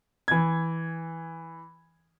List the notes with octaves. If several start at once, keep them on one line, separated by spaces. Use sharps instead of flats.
E3 G#6